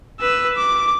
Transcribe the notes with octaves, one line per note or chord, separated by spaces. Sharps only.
B4 E6
D6